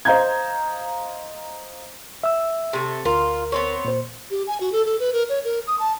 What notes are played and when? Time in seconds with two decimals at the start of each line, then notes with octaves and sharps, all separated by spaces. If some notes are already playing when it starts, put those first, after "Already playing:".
0.05 C5 D#5 F5 A#5 G6 G#6
2.24 E5 E6
2.73 C3 A3
3.05 D2 F4 A#4
3.52 B3 C4 C#5
3.85 A#2 C5
4.31 G4
4.47 G#5
4.61 F#4
4.72 A4
4.86 A4
5.00 B4
5.13 A#4
5.29 C#5
5.44 A#4
5.67 D#6
5.79 A5